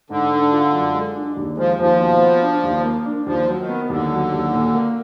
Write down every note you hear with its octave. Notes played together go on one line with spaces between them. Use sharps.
G#2 D3
D4
F4
F#2
G#3
D4
D#2
F3 G#3
D#2 F3
B2
B3
D4
D#2
A#3
D4
D#2 F3
F#3
D#3
B3
D#2 D3
F#3
D#2
A#2
A#3